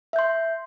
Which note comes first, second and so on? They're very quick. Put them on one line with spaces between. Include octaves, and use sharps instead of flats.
E5 G6 C6